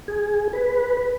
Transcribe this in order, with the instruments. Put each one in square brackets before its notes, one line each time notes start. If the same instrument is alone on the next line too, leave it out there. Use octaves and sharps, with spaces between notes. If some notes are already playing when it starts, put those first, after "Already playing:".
[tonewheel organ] G#4
B4